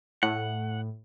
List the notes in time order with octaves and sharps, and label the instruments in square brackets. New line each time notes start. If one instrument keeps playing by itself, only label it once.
[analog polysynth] A2 [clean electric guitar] F#5